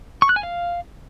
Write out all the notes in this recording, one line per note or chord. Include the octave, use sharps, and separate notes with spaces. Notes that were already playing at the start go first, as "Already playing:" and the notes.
C#6
F#6
G#5
F5